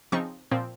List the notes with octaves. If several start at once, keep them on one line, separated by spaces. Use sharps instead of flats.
C#3 F3 C4 D#4 C#6
A#2 F3 C4